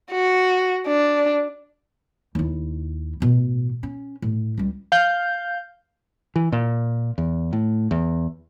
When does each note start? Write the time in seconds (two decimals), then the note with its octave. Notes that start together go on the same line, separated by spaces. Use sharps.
0.12 F#4
0.87 D4
2.35 D#2 E4
3.20 A1 B2
3.83 C#4
4.22 A2
4.58 C#2 G3
4.92 F5 G6
6.36 E3
6.52 A#2
7.18 E2
7.53 A2
7.91 E2